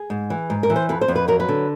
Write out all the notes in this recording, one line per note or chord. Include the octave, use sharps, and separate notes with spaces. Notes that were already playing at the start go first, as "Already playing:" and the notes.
Already playing: G#4
G#2
E3
G#2
A#4
E3
C5
F2 B4
C5
F2
B4
F#3 A#4
B4
D3